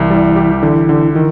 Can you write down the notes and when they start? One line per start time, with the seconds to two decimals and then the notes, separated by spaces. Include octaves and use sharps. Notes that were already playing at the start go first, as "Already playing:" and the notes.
Already playing: C2 E3 E4
0.10 G3
0.36 G4
0.62 D3 E3 E4
0.89 D3
1.15 D#3 E3 E4